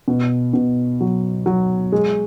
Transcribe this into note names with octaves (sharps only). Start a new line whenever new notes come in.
B2
B2
F#3
F#3
G#3